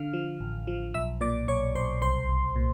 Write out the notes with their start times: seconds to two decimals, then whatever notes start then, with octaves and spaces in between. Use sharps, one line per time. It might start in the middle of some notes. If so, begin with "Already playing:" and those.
Already playing: D3 F5 F6
0.13 F3
0.40 A1
0.67 F3
0.94 B1 E5 E6
1.21 A#2 D5 D6
1.48 B1 C#5 C#6
1.75 B1 C5 C6
2.02 C2 C5 C6
2.29 C2
2.56 A#2